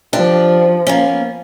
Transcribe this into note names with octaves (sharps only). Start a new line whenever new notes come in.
F3 D4 G4
A#3 B3 C#4